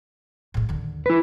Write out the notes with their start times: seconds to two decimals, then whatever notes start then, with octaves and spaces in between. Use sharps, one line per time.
0.54 A2 G#3
0.69 D#2 D3
1.06 E4 B4